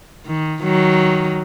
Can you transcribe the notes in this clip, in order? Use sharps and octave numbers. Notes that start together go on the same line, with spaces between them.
D#3
D#3 F#3